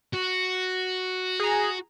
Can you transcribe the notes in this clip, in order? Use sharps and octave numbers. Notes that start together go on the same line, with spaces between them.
F#4
G#4 A#5